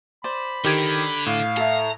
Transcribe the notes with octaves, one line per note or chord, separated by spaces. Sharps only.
C5 D5 B5
D3 D#3 G4 G#6
A2 F5
A4 E5 A#5